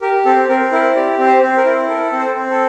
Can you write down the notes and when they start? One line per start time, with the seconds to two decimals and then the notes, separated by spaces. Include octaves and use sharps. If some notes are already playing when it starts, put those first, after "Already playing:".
0.02 G4 A#4
0.25 C4 A4
0.49 C4 A#4
0.72 E4 A#4
0.95 G4 D5
1.18 C4
1.26 C5
1.42 C4
1.57 A#4
1.65 E4
1.89 A4 A#4
2.12 C4
2.20 C5
2.35 C4
2.50 A4